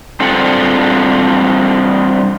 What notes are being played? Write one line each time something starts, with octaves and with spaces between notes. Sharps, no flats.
G3 C4 D4 F4 A4 F#5